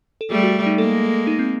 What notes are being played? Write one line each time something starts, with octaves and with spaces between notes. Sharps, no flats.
A4
G3 A3 G#4
F#4
D#4
G#3 A#3 A4
D#4
C4